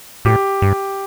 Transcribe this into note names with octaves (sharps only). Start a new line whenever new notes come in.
A2 G4
G2